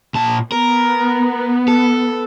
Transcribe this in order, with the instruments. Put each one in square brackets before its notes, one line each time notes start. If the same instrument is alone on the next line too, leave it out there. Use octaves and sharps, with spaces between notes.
[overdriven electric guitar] A#2 A5
[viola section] B3 [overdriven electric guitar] A#4
[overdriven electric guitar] A4